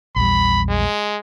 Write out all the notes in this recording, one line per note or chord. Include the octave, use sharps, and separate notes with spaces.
A#1 E2 G3 B5
G#3